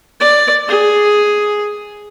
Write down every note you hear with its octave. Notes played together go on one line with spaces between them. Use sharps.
D5
G#4